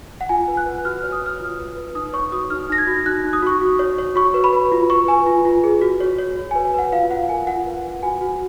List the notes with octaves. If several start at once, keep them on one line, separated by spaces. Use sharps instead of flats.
F#5
F4 G#5
B4
F#6
B4
F#4 F6
C#5 F6
D#6
C#5 F6
F4
B4
B4
D#4 D#6
C#5 C#6
F#4 D#6
D#4 F6
D#4 A#6
G#6
F#4
D#4 F#6
D#4
D#6
F#4 C#6
F#4
C#5
C#5
F#4 C#6
B4
B5
B4
F4
B4 C#6
B4 G#5
F4
F4
G#4
F#4
C#5
C#5
F#4
B4 G#5
G#5
B4 F#5
F4 F5
F4 F#5
A#4 G#5
F4 F#5
B4
B4
F#4 G#5
F#4